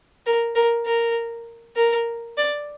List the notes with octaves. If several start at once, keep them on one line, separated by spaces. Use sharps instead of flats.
A#4
A#4
A#4
A#4
D5